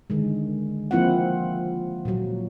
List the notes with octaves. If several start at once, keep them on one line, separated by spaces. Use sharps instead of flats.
D3 D#3 G#3
F3 A#3 C4 E4 F4 F#5
A#2 F#3